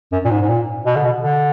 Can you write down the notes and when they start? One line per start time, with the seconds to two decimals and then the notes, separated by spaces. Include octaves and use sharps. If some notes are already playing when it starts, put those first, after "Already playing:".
0.12 F#2
0.25 A#2
0.31 G#2
0.41 G#2
0.48 A#2
0.86 B2
0.96 D3
1.05 B2
1.23 D3